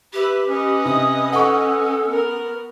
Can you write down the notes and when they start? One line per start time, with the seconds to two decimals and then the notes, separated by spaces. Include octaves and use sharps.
0.13 G4 B4 E5
0.47 C#4 B4 D#5
0.85 C3 D#6
1.32 A4 F#5 C#6
2.05 B3 A#4